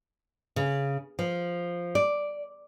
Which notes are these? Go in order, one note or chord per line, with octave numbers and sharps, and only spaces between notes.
C#3
F3
D5